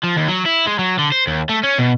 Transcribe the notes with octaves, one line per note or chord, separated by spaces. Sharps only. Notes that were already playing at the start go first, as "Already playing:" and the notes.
F3
D#2
F#3
E4
G#3
F#3
D3
C5
D#2
A3
C#4
B2